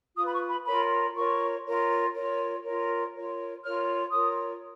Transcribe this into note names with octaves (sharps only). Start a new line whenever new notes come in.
F4 B4 D#6
B5
C#6
B5
F4 A#4 C#5 B5
F4 A#4 C#5 C#6
F4 A#4 C#5
F4 A#4 C#5
F4 A#4 C#5
F4 A#4 C#5
F4 A#4 C#5 F6
F4 A#4 C#5 D#6